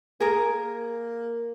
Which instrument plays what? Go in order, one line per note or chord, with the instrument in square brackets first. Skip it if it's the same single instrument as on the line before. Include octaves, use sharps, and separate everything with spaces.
[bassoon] A#3 [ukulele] G#4 A#4